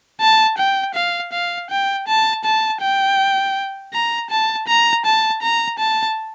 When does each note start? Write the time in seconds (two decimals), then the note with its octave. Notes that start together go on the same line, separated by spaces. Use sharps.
0.21 A5
0.58 G5
0.95 F5
1.32 F5
1.70 G5
2.08 A5
2.45 A5
2.81 G5
3.93 A#5
4.30 A5
4.68 A#5
5.05 A5
5.42 A#5
5.79 A5